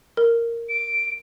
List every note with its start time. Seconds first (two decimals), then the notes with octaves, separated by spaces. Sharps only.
0.17 A#4
0.69 D7